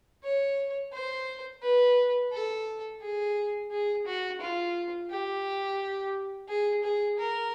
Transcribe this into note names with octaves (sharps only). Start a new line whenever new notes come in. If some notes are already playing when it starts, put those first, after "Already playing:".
C#5
C5
B4
A4
G#4
G#4
F#4
F4
G4
G#4
G#4
A#4